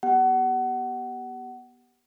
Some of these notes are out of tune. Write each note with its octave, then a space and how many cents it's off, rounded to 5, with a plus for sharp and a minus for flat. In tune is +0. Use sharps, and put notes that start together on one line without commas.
B3 -20 G4 +0 F#5 +25